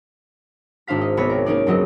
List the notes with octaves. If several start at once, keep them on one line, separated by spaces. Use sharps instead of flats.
G#1 D4 C5 F5 B6
D#5
C2 B3 C4 C#5 B5 G#6
A#4
A#3 C#4 D#4 D5
F#1 C#2 F#3 C4 D#5